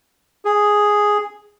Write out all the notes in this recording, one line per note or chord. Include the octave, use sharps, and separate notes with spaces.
G#4